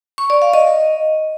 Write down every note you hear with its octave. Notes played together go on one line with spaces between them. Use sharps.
C#6
D5
F5
D#5